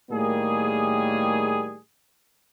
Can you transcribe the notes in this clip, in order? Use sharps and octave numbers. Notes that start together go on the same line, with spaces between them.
A2 D#3 G3 A#3 G#4